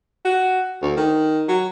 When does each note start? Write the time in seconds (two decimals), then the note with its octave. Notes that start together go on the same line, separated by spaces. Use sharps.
0.25 F#4
0.82 D2
0.97 D#3
1.48 F#3